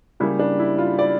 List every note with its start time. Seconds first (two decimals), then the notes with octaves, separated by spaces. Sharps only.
0.20 C#3 G3 A#3 E4
0.39 D4
0.59 E4
0.78 F4
0.99 D5